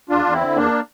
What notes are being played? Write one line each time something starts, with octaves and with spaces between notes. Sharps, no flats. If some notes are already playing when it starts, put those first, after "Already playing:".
E2 D4 F4
E2
C4 E4
D3
E2 A#3 D4